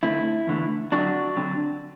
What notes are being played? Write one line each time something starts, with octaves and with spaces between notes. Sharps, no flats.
D3 A3 C4 E4
E2 D3 A3
D3 F#3 C4 D4 F#4
D3 F#3 C4